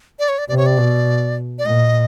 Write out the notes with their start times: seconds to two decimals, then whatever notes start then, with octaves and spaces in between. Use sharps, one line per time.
0.19 D5
0.28 C#5
0.38 D5
0.49 C3 D5
0.57 C#5
0.66 D5
0.77 B2
1.59 D5
1.65 A#2 D#5